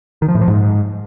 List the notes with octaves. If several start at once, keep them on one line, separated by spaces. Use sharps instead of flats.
D#3
F3
A2
F3
G#2